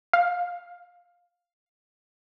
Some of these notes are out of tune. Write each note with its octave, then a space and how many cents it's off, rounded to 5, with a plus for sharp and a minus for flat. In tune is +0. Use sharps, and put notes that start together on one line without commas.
F5 +15